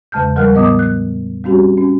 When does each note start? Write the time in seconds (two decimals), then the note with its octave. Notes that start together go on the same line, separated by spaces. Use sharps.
0.12 E2 C#3 G#3 A5 F6 G6
0.36 F3 G3 A#4 F#5 F6 F#6
0.54 A2 B3 D#5 D6 D#6
0.79 F#6
1.44 G3 C4 C#4 F#4 G4
1.78 C#4